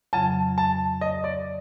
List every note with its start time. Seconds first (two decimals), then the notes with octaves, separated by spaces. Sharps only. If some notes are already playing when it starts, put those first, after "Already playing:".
0.13 F2 C#3 F#3 A5
0.58 A5
1.01 D#5
1.24 D5